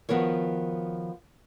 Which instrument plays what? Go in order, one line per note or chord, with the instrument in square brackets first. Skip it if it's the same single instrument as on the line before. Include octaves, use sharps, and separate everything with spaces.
[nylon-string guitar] D#3 F3 B3 F#4 A#4 C#5